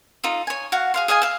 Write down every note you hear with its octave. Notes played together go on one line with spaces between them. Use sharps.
D#4 F4 A4
C#5 G#5
F#4 F5 F#5
G#4 F5 C6
G#4 D#5 F5 G#5
E5 F5